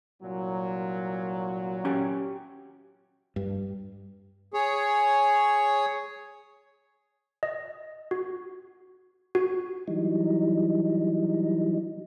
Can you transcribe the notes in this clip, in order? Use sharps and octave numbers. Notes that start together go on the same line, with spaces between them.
C2 A#2 F#3
C#4 G4 G#5
G2
G#4 C#5
D#5
F#4
F#4
E3 F#3 G3 D#4